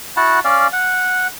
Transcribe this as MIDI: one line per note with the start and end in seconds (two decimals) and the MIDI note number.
0.17 0.39 64
0.17 0.39 66
0.17 0.39 78
0.17 0.39 81
0.44 0.67 61
0.44 0.67 74
0.44 0.67 77
0.72 1.27 78